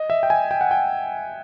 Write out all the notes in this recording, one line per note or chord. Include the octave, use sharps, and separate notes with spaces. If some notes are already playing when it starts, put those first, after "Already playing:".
Already playing: D#5
E5
G5
G#5
G5
F#5
G5